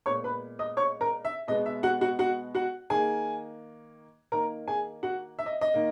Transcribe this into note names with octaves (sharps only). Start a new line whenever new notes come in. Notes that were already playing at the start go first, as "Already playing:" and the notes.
A#2 G#3 B3 C#5 C#6
B4 B5
D#5 D#6
C#5 C#6
A#4 A#5
E5
B2 G#3 B3 D#5
E5
F#4 F#5
F#4 F#5
F#4 F#5
F#4 F#5
D#3 A#3 G#4 G#5
D#3 A#3 A#4 A#5
G#4 G#5
F#4 F#5
E5
D#5
D#5
D#3 A#3